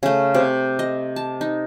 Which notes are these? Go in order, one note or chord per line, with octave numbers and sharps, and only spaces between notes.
C#3 A3
C3
D#5
A5
D#4